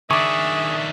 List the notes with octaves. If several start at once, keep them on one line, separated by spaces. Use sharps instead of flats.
D#3 D4 G#4 E5 C#6 D6